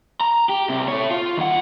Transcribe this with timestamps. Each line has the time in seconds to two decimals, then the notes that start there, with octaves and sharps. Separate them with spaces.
0.21 A#5
0.49 G4
0.69 C2 C3
0.88 A4 C#5
1.11 F4
1.37 D#2 F#5